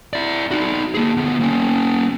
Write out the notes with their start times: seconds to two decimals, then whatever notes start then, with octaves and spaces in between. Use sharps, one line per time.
0.13 E4 D5
0.51 D#4 F#4
0.94 A#3 G#4
1.17 D2 B3
1.41 A#3 C#4